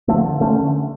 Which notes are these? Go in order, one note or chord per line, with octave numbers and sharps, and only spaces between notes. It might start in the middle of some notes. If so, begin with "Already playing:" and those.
D3 F3 A3
D3
D3 A3 C#4
D3